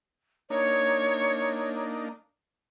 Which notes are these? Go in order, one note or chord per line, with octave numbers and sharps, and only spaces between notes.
A#3 D4 D#4 C#5